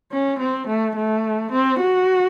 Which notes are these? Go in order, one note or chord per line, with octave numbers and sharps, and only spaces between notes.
C#4
C4
A3
A3
C4
F#4